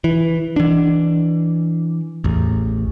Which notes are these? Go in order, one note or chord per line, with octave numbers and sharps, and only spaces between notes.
E3
E3 D4
A1 E2